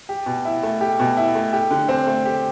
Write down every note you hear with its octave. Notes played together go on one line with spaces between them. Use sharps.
G4
B2
E4
A3
G4
B2
E4
A3
G4
D3
C4
A3
G4